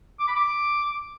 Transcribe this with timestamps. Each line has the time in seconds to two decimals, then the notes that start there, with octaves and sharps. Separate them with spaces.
0.20 D6
0.28 B5
0.36 D6